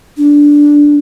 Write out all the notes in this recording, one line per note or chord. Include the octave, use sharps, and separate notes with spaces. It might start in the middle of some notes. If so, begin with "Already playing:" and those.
D4